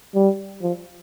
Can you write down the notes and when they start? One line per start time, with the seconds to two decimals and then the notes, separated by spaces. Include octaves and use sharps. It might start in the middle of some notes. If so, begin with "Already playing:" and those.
0.15 G3
0.61 F3